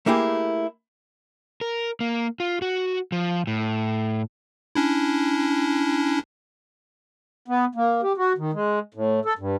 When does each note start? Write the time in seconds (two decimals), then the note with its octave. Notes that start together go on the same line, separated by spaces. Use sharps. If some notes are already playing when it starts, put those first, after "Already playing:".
0.06 A3 A#3 E4 G4 G#4
1.61 A#4
2.00 A#3
2.40 F4
2.62 F#4
3.12 F3
3.47 A2
4.75 C#4 D4 E4
7.48 B3
7.75 A#3
8.03 G4
8.17 F#4
8.38 D#3
8.53 G#3
8.94 A2
9.25 A4
9.39 G2